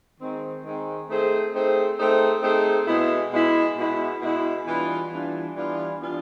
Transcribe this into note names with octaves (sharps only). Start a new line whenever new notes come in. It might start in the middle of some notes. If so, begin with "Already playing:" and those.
D#3 G#3 C4
D#3 G#3 C4
A3 C4 D#4 G#4 C5
A3 C4 D#4 G#4 C5
A3 C4 D#4 G#4 C5
A3 C4 D#4 G#4 C5
B2 G#3 B3 E4
B2 G#3 B3 E4
B2 G#3 B3 E4
B2 G#3 B3 E4
E3 G3 B3 D4 F4
E3 G3 B3 D4 F4
E3 G3 B3 D4 F4
E3 G3 B3 D4 F4